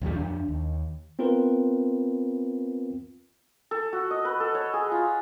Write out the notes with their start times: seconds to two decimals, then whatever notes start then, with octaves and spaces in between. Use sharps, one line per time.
0.01 A#1 D#2 A#2 G3
0.13 F2 D4
0.49 D#2
1.19 B3 C4 F4 A#4 B4
3.71 A4
3.93 F#4
4.11 D#5
4.25 B4
4.40 A4
4.55 C#5
4.73 G#4
4.92 F4